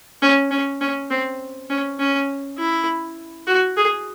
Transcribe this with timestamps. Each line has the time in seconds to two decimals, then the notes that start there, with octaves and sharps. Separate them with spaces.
0.22 C#4
0.51 C#4
0.81 C#4
1.10 C4
1.70 C#4
1.99 C#4
2.59 E4
3.47 F#4
3.77 G#4